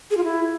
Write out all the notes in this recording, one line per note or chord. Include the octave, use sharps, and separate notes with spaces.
G#4
F4
E4